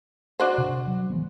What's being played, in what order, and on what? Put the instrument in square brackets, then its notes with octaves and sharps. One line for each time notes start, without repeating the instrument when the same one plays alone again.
[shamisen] D4 F#4 C5
[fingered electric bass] C3
F#3
E3 G#3 B3